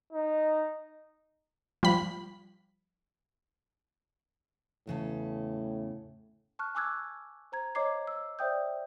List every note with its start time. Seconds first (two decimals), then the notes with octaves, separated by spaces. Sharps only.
0.13 D#4
1.83 F3 G3 B5
4.87 E2 A2 C#3 A4
6.59 A5 C#6 F6 F#6
6.75 G#5 C#6 D6 E6 F#6 G#6
7.52 C5 A#5 G#6
7.75 C#5 D#5 A#5 D6 G#6 C7
8.07 E6
8.39 C5 D5 E5 G5 D#6 G6